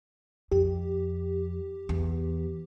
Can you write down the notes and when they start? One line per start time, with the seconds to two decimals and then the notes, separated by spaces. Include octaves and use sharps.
0.52 F2 G4
1.89 E2